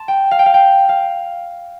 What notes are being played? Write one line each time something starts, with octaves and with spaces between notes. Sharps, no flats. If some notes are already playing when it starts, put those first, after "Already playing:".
Already playing: A5 C6
G5
F5
G5
F5
G5
F5